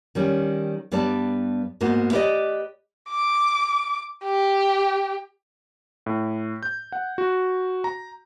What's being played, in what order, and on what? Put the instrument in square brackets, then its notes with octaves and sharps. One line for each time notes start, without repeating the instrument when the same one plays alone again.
[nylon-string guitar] D#3 G3 C#4
G2 G3 B3 B4 D5 A5
G#2 A#3 B3 D#4 F#4
E4 G4 B4 C5 D5 D#5
[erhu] D6
G4
[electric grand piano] A2
G6
F#5
F#4
A#5